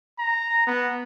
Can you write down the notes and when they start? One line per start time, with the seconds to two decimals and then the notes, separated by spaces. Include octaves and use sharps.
0.19 A#5
0.67 B3